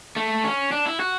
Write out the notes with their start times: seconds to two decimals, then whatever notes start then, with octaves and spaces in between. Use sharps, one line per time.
0.16 A3
0.44 C#4
0.72 D4
0.86 E4
1.00 F#4